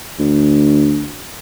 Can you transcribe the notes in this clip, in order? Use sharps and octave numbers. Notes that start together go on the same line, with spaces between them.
D2